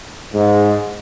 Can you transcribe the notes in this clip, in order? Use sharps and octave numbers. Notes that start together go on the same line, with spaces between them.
G#2